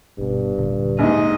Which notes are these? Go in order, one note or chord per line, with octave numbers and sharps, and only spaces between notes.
G1 G2 B2
D#1 A#2 D3
A#1 G#2 D#5